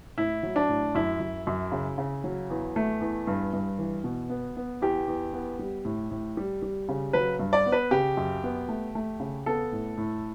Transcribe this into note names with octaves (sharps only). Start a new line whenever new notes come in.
A2 E4
F#3
D4
A2
F#2 E4
F#2
F#2
C#3
C#3
F#3
E2
A3
E2
G2
G2
E3
B2
B3
B3
E2 G4
E2
B3
G3
A2
A2
G3
G3
C#3
F#3 B4
G2
D5
B3
B4
C#3 G4
F#2
B3
A3
A3
C#3
B3 A4
A2
A2